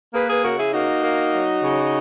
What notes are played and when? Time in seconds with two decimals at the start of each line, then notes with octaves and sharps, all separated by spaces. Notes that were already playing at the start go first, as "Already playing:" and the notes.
0.14 A#3 G#4 B4
0.29 G#4 B4
0.44 C#3 F#4 A#4
0.58 E4 G#4
0.74 A#3 D#4 F#4
1.03 A#3
1.33 F#3
1.63 C#3